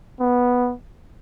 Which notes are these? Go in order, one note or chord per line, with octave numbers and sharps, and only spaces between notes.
B3